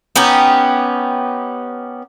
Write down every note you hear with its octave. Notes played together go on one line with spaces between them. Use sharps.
B3 C#4 D#4 G4